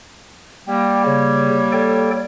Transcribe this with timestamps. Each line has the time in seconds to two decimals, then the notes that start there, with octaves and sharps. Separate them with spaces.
0.67 G3 A#3 G5
1.06 C#3 C#5
1.72 A4 D5 G5